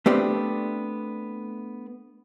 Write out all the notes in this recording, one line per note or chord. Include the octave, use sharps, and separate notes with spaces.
A3 B3 C4 D4 G4 D5